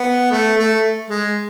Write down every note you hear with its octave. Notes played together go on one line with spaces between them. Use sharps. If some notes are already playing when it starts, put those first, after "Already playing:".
Already playing: B3
A3
A3
G#3